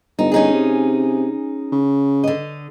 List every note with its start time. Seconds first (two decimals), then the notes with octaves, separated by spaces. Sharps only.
0.19 G1 D#4
0.32 C#4 D#4 G#4
0.53 C3
1.72 C#3
2.24 D3 D#5